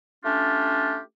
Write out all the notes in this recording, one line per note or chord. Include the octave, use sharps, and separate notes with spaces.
A3 C#4 D4 F4 G4